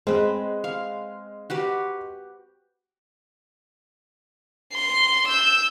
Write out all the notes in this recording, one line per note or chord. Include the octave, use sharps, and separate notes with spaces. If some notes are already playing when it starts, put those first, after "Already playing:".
G#3 C4 B4
F5
F#4 G4 B4
C6
E6 G6